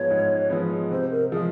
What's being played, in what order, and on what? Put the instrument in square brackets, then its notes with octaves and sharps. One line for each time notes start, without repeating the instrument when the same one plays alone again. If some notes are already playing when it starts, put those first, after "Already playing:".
Already playing: [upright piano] G#2 F3 G#3 B3 [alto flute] C#5
[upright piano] G#2
F3 G#3 B3
[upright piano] C3 [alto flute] C5
[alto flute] A#4
[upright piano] F3 G#3 [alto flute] G#4